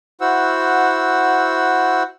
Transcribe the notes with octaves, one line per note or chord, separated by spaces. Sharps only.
E4 F#4 C5 F#5 E6